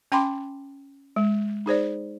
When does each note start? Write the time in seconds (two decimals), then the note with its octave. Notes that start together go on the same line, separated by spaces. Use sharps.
0.12 C#4 G5 A5 B5 C6 D6
1.16 G#3
1.66 D#4 G#4 C5 D5